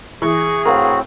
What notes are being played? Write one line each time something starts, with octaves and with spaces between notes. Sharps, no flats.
E3 G#4 C#6
A2 C4 F#4 A#4 F5